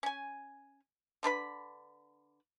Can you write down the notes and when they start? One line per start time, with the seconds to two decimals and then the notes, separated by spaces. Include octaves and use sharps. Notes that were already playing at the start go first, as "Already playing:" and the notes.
0.03 C#4 G#5
1.23 D3 D4 B4 B5